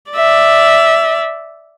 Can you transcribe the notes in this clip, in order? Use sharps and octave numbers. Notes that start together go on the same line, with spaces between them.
D5 E5